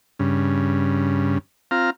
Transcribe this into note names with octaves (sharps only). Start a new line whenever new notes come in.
G2 C#3
C4 F4 F5 A#5